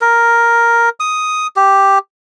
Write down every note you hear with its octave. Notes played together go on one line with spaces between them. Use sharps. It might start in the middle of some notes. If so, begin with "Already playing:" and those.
A#4
D#6
G4